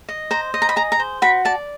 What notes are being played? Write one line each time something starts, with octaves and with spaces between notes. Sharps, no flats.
D#5
C5 A#5
D#5
A#5
B5
G#4 A#5
A#5
C5
F#4 B5
D5 A5